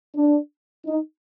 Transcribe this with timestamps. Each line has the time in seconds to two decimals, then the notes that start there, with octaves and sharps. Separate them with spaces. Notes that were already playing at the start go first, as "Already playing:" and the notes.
0.16 D4
0.87 D#4